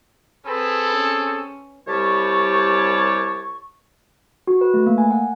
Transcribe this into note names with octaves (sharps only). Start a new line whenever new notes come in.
C4 G#4 A4 B4
C#4
C2 G3 G4 C#5 A5 C#6
F#4
B4
A3
A#3
G#5
F#5